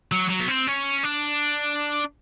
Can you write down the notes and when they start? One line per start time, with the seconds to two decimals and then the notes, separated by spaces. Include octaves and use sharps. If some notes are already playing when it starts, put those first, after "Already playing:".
0.12 F#3
0.30 F#3
0.40 B3
0.48 C4
0.67 C#4
1.04 D4